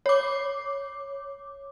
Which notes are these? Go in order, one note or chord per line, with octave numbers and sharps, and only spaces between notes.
C#5 D6